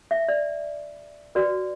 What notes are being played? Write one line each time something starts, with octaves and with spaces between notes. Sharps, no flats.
E5
D5
F#4 B4 D5